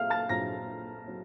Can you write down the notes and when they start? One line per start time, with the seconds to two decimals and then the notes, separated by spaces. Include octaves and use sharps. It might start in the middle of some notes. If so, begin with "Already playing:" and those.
Already playing: A#2 F#3 C4 F5 F6
0.10 A5 A6
0.29 A#1 A#2 F#3 C4 A#5 A#6
1.08 F#3 C4